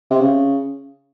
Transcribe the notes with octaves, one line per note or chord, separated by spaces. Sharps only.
C3
C#3